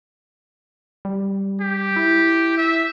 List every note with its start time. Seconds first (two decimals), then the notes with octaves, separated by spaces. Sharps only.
1.05 G3
1.61 G4
1.96 E4
2.58 E5